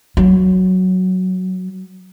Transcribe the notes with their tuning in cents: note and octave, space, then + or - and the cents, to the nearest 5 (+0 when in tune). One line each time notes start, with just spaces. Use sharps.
F#3 +5